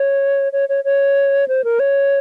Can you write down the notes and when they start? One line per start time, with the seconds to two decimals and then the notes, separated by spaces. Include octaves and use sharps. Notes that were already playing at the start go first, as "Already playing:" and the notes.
Already playing: C#5
0.53 C#5
0.69 C#5
0.84 C#5
1.48 C5
1.64 A#4
1.80 C#5